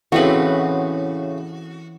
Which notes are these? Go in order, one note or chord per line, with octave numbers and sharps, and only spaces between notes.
A2 C#3 E3 C4 F#4 B4